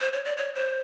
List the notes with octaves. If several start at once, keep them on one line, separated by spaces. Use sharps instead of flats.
C5
C#5
D5
C#5
C5